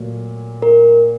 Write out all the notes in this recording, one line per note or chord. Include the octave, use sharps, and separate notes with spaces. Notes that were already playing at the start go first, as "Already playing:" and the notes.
Already playing: A#2 F#3 A3
A#4